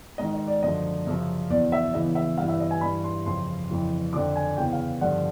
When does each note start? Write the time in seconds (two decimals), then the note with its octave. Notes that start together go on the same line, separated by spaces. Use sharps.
0.18 G#2 D#3 D#5
0.33 D#5
0.47 D5
0.63 F#2 D3 F3 D#5
1.07 F#2 C#3 F3
1.50 E2 B2 D5
1.72 E5
1.94 E2 C#3 E3 D#5
2.15 E5
2.38 G2 E3 F5
2.48 E5
2.60 D#5
2.71 G#5
2.81 G2 E3 B5
3.04 C6
3.26 F2 C#3 F3 C6
3.70 F2 C#3 E3
4.13 F2 D3 F3 D6
4.36 G#5
4.57 E2 C#3 E3 G5
4.72 F5
5.01 G2 D3 F3 F#5